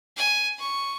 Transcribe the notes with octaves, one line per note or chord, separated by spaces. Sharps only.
G#5
C#6